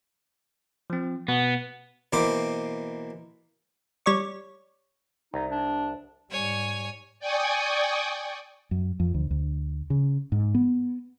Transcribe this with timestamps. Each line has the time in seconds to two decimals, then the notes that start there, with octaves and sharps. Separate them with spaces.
0.90 F3 C4
1.28 B2 B3
2.13 B2 E3 A#3 C5 D6
4.06 G3 C#5 D5 C#6
5.34 C2 D#4
5.51 D4
6.31 G#2 G3 C#5 G#5
7.19 D5 G5 G#5 C#6 D#6
8.71 F#2
9.00 F2
9.14 D2
9.31 D2
9.90 C#3
10.32 G#2
10.55 B3